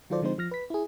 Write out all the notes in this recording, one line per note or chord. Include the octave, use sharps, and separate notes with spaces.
D#3 F#3 F4 A4 C5 D5
D3 F3 G#3 C4 D#4 C5
F3 F6 A#6
B4 B6
E4 G#4